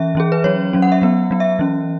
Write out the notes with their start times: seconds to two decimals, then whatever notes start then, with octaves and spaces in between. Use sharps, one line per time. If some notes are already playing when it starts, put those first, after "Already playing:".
Already playing: E3 C#4 E5
0.15 E3 C#4 G#4
0.32 B4
0.44 F#3 C#4 C#5
0.73 F#3 C#4
0.82 F#5
0.92 E5
1.02 F#3 B3
1.31 F#3 B3
1.40 E5
1.59 E3 C#4